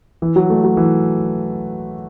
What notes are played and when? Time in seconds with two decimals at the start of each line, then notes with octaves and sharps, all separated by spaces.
0.22 E3
0.36 F#3
0.50 A3
0.63 F#3
0.77 E3